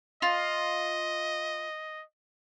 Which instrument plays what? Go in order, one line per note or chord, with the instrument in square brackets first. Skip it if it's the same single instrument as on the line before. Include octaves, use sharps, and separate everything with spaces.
[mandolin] F4 [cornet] D#5